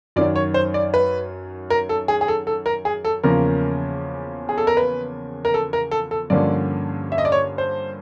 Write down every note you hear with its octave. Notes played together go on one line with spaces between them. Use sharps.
F#2 D#3 F#3 D5
C#5
C5
D5
B4
A#4
A4
G#4
G#4
A4
A4
A#4
G#4
A4
E2 C#3 F3 A#3 C#4 A#4
G#4
A4
A#4
B4
A#4
A4
A#4
A4
A4
G2 D3 F3 A#3 C#4 D5
E5
D#5
D5
C#5
C5